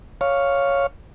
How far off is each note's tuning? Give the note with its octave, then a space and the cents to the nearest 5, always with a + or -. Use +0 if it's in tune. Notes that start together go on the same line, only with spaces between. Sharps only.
C#5 +0 F5 +0